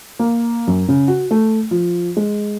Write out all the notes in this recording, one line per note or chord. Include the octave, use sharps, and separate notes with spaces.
A#3
F#2
C#3
F#4
A3
F3
G#3